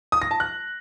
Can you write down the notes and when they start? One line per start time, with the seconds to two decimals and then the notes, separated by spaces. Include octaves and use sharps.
0.12 D#6
0.22 A#6
0.31 A5
0.40 F#6